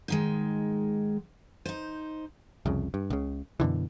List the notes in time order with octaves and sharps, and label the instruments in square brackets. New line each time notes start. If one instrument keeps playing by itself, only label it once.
[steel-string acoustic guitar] G#2 D#3 G#3
D#4 C5
[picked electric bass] C2 F2 C#3
G2
C#2 C#3
F#2 B2 D3 E3